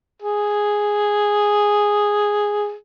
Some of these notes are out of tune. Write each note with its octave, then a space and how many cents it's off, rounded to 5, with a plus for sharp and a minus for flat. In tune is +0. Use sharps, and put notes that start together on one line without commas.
G#4 -5